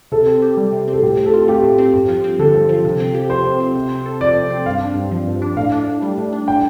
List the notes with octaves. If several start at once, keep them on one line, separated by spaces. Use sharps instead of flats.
C3 A4
C4
G4
G3
C3
C4
A4
A2 G4
C4
A4
F4
A3 G4
A2
C4
G2
F3
C4
D3 A4
G2
F3
C3
C4
G4
F3 C5
C3
C4
C3
C4
A4
F3 D5
C3
C4
G2 F5
D4
G2
F3
G2
D4
A2 F5
D4
A2
G3
A2
D4
A2 G5